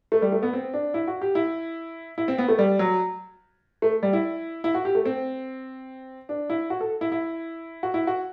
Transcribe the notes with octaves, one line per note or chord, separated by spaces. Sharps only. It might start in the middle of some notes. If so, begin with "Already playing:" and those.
A3
G3
A3
B3
C4
D4
E4
F#4
G4
E4
E4
C4
B3
A3
G3
F#3
A3
G3
E4
E4
F#4
G4
A3
C4
D4
E4
F#4
A4
E4
E4
F#4
E4
F#4